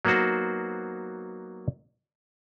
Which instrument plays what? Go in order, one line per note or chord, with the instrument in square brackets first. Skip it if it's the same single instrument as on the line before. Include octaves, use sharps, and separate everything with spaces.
[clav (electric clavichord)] F#3 A#3 B3 D#4 F#4 C5